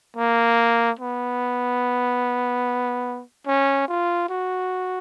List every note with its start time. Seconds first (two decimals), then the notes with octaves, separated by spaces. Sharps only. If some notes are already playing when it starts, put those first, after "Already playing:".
0.17 A#3
0.99 B3
3.47 C#4
3.88 F4
4.29 F#4